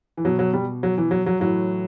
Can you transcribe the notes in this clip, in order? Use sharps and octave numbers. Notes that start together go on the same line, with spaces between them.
E3
B2 F#3
F#3
G3
F#3
E3
F#3
F#3
A2 E3 F#3